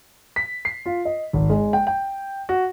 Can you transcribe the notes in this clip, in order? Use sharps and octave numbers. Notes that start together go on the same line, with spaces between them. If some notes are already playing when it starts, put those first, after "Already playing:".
B6
C7
F4
D#5
G#1
G#3
G5
G5
F#4